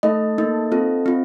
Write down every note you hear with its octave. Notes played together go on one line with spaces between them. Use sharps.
A3 D#4 A4 D#5
A#3 D#4 A4
C4 F4 A4
C4 F4